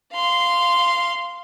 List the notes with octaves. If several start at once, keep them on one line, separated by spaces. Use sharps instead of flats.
F5 C6